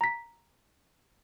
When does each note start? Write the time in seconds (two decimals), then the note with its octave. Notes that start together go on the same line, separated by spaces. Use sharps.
0.01 A#5 B6